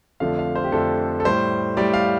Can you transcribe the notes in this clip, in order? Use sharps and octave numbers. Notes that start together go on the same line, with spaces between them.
F2 D3 F3 A3 F5
F5
C5
G4
F2 D3 F3 A3 A4
A4
A2 G3 C5
A2 G3 D5
F5